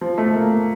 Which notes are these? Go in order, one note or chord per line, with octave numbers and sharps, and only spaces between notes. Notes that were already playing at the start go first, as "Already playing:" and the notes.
F3
A3
A#3
A#3